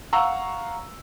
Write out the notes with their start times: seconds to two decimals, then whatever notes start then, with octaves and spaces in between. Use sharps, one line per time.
0.13 F5 F#5 A#5 C#6 E6